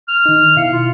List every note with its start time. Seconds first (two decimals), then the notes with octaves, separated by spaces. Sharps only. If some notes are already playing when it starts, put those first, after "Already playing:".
0.08 F6
0.26 D#3 D#4
0.56 B2 E4 F5 C#7
0.72 F4